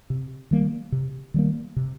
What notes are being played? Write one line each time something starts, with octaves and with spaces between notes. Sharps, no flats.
C3
D#3 G3 A#3
C3
D#3 G3 A#3
C3